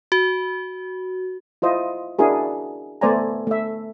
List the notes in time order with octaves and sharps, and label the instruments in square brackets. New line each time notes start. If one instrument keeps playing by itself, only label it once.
[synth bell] F#4
[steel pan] E4 F4 C5 D#5
D4 E4 F#4 G#4 A#4
A3 B3 C5 D5 G#5 A#5
A3 E5